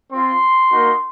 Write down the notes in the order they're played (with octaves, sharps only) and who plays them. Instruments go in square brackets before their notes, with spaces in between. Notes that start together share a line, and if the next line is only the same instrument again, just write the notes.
[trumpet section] C4 F4 C6
A#3 D#4 F#4